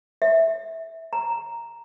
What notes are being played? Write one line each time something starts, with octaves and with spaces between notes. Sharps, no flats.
E5
A#5